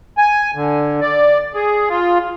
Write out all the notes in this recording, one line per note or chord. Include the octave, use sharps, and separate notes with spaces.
G#5
D3
D5
G#4
F4